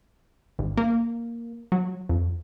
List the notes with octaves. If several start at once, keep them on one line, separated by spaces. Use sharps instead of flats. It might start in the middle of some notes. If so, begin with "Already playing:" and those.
G#1
A#3
F#3
F2